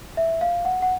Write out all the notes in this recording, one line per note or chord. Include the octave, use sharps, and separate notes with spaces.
E5
F5
F#5
F#5